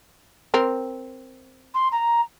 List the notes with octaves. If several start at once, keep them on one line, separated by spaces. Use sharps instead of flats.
C4 A#4
C6
A#5